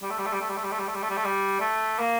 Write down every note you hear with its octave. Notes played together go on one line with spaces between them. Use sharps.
G3
A3
G3
A3
G3
A3
G3
A3
G3
A3
G3
A3
G3
A3
G3
A3
G3
A3
A#3